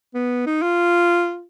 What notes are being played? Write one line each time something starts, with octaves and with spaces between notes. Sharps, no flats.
B3
D#4
F4